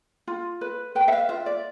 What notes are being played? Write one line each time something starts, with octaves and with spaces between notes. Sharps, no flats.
F4
B4
B4 G5
E5
F5
F4 E5
D5